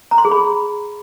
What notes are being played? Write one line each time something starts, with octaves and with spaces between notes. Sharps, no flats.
A#5
C6
G#4
B5